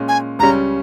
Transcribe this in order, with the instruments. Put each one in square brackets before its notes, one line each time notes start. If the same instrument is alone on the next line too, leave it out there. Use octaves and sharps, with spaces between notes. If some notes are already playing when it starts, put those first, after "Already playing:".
Already playing: [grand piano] A#2 G#3 C#4
[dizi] G#5
[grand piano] C#2 C#3 G3 C#4 [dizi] A#5